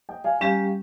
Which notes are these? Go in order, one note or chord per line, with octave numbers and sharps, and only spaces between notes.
D#5 G5
F5 G#5
G3 C#4 G4 F5 G#5